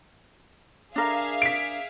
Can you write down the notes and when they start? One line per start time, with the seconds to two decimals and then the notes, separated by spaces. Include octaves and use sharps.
0.96 D4 G#4 A#4 E5 F5
1.42 B6 D7